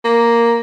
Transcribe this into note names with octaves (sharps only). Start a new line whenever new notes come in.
A#3